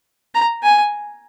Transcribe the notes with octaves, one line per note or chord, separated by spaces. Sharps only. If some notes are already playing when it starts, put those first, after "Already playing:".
A#5
G#5